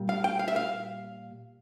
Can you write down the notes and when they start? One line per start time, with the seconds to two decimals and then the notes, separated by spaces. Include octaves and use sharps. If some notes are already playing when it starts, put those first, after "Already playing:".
Already playing: A#2 G3
0.09 F5
0.24 G5
0.39 F5
0.48 E5
0.56 F5